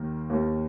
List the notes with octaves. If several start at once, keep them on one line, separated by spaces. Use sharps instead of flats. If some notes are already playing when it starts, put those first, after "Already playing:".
Already playing: D#2 D#3 A#3
D#2 D#3 A#3